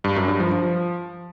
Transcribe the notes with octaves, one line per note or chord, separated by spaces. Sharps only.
G2
F#2
G2
F3
F3